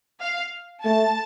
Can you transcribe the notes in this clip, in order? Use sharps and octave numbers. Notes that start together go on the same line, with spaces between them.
F5
A3 A5